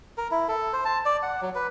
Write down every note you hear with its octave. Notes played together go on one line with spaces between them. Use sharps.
A#4
E4
A4
C5
A5
D5
F#5
F#3
B4